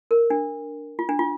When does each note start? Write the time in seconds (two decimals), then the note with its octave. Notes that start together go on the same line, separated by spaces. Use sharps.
0.11 A#4
0.30 D4
0.99 F4
1.09 D4
1.19 F4